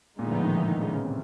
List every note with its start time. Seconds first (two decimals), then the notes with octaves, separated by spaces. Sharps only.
0.19 A#2 D3 F3 G#3 B3 D#4
0.32 A2
0.44 D#3
0.57 E3
0.68 D#3
0.80 C#3
0.93 C#3
1.05 C3